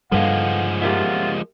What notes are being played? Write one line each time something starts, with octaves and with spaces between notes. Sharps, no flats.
G2 F3 G3 G#3 A4 B4 F5 F#5
F4 G4 A#4 E5 F#5